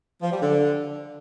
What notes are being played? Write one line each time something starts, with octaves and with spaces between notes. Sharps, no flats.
F3
G3
D3